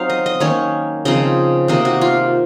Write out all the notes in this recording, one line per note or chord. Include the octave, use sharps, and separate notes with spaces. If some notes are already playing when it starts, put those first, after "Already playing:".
Already playing: F#3 C4 D#4 F5
D#5
D#5
D#3 A#3 C#4 C#5
C#3 F3 C4 D#4 D#5
C3 D#3 A#3 D#5
F#4
F4